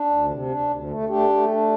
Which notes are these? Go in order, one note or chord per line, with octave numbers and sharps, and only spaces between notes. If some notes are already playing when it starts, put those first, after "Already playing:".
Already playing: D4
D2
C3
D4
D2
A3
A3 D4 G4
A3
D4